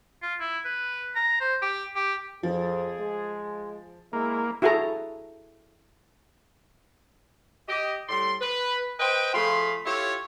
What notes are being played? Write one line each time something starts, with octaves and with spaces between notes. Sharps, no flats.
F4
E4
B4
A#5
C5
G4
G4
F2 F3 G#4
G#3
G#3 A#3 E4
E4 F#4 G#4 A4 A#5
G4 D#5
A2 G3 D5 C6
B4
B4 C5 D#5 G5
F3 A3 F4 G#4 B5 C6
E4 F4 G4 A4 C#5